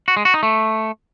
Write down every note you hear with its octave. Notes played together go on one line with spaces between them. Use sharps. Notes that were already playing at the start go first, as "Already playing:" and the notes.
F#4
G#3
F#4
D#4
A3